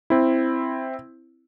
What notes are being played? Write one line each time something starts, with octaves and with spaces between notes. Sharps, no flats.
C4 E4